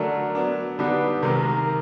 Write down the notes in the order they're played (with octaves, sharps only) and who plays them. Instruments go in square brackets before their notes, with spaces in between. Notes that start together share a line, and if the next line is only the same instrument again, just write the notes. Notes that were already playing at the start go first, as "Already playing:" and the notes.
Already playing: [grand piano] D3 F#3 A3 D4 [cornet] A#4
[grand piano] F#3 B3 D4
[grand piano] D3 G3 B3 D#4 G4 [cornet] B4
[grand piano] C3 D#3 G#3 [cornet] A#4